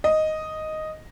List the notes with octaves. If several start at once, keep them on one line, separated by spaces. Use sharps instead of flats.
D#5